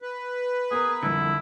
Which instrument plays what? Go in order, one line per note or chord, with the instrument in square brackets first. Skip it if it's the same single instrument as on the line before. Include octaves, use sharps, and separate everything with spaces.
[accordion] B4
[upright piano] B3 A#4 [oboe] G#4
[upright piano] C2 F2 [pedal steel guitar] D3 [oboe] E4